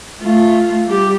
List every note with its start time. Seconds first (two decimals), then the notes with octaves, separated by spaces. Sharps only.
0.21 A3 F4
0.86 G3 G4